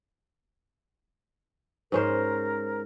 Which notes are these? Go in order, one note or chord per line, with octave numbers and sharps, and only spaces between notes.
G#2 C#4 A#4 C5